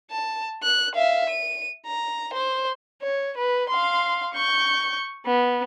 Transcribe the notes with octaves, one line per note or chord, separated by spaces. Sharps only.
A5
F#6
E5 F5
D#7
A#5
C5
C#5
B4
F5 C6
C#6 G6
B3